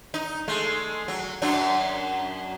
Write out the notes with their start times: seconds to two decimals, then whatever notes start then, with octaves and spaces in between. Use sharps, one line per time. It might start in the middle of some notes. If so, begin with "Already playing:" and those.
0.14 D#4
0.48 G#3 A3
1.08 F#3
1.42 F#2 F#3 D4